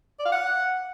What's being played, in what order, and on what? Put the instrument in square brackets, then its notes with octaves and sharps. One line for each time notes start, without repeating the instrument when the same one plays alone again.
[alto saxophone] D5
F5
F#5